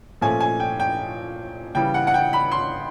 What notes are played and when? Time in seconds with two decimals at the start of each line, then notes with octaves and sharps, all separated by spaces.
0.21 A#2 F3 A3 C#4 G#5
0.40 G#5
0.60 G5
0.80 G5
1.75 C#3 E3 G3 G5
1.94 F#5
2.07 F#5
2.14 G5
2.33 B5
2.52 C6